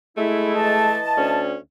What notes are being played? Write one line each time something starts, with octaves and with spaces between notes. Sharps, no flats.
G#3 A3 E4
E3 D#5 A5
D2 C#4